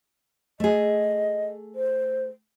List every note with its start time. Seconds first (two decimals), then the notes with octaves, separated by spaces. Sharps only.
0.60 A3 G#4 D#5
1.75 C5